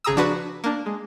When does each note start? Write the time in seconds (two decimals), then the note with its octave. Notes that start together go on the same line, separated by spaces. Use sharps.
0.04 G#1 C#3 G#4 A#5 D#6 E6
0.16 F3 D4 F#4 B4
0.64 A#3 D4
0.86 G#3